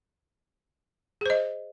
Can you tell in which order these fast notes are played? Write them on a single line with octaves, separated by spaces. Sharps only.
G#4 C5 D#5